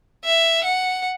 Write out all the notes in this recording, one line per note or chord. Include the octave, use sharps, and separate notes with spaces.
E5
F#5